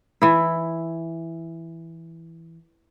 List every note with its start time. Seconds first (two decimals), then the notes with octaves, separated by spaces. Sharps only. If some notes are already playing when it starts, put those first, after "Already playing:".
0.22 E3 E4